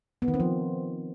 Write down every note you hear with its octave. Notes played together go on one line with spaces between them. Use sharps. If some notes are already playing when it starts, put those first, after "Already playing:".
B3
D#3
C4
F3